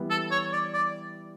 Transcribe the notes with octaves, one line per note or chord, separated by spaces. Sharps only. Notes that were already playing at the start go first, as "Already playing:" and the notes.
Already playing: E3 G3 B3 E4
A4
C#5
D5
D5